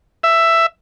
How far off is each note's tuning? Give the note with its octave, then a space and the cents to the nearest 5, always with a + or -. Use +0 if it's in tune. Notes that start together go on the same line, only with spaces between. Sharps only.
E5 +10